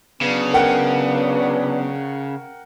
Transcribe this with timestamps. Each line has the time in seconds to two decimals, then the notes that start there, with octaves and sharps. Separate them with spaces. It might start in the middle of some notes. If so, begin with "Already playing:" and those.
0.21 C#3 F#3 B3 D4
0.53 A#4 F#5 G5